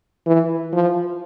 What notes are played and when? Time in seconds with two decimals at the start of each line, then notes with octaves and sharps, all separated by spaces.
0.26 E3
0.73 F3